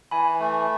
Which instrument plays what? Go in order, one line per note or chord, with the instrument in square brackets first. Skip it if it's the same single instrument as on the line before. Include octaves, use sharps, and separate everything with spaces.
[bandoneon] E3 [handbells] G#5 B5
[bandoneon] A3